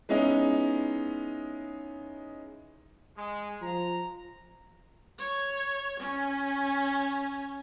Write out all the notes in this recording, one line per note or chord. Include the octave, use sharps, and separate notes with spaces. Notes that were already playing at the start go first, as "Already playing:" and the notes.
G#3 B3 C#4 D#4 E4
G#3
F3 A#5
C#5
C#4